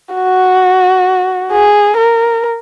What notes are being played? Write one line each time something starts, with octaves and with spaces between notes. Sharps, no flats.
F#4
G#4
A#4